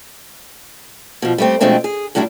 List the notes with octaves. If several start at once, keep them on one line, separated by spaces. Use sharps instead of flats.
B2 F3
G3 A3 C4
F2 B2 G#3 A3 C4 D4
G#4
A2 F#3 G3 D4 E4